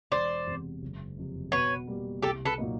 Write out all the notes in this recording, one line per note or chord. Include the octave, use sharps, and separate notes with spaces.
E1 C5 D5
E2 C3
F#1
F2 C3
B2 B4 C#5
G3 A#3
C2 G4 A4
A4 B4
A#2 F#3 A#3 D#4